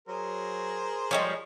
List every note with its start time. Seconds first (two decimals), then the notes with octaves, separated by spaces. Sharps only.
0.08 F#3 G#4 A#4 C5
1.11 F3 G3 G#3 C#5